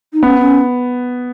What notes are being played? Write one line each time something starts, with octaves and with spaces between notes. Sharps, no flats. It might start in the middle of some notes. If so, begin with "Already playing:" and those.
D#4
B3 C#4
C#4